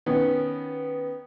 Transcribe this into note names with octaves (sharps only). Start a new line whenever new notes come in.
D#3 B3 C#4